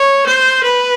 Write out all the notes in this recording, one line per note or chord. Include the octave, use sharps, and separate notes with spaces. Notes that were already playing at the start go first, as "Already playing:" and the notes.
Already playing: C#5
C5
B4